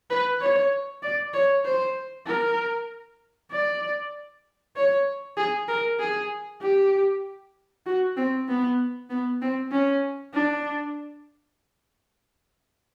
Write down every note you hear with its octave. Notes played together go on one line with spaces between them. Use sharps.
B4
C#5
D5
C#5
C5
A#4
D5
C#5
G#4
A#4
G#4
G4
F#4
C4
B3
B3
C4
C#4
D4